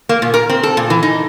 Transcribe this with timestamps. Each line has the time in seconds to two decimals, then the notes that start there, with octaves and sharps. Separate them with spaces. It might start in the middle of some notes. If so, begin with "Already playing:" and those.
0.09 A#3
0.22 A#2
0.34 A#4
0.50 C4
0.63 A4
0.77 A#2
0.90 E3
1.03 D#4